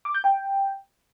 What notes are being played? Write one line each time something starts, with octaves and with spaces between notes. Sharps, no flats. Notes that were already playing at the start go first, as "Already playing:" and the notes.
D6
G6
G5